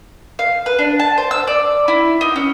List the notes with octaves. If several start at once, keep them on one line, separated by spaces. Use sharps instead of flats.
F5
B4
D4
A5
C5
E6
D5
E4
D#4
C#4